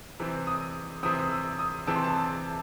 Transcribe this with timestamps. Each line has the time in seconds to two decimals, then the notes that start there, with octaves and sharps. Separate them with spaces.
0.20 C3 E3 C4
0.47 D#6
1.03 C3 E3 C4 D#6
1.19 D#6
1.32 E6
1.59 D#6
1.87 C3 E3 C4 A5
1.96 C6
2.04 A5